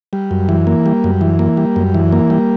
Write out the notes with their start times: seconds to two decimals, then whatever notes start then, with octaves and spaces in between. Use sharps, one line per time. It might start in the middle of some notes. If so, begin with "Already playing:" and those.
0.13 G3
0.31 F#2
0.49 E3
0.67 A#3
0.86 G3
1.04 F#2
1.21 E3
1.39 A#3
1.57 G3
1.76 F#2
1.94 E3
2.12 A#3
2.30 G3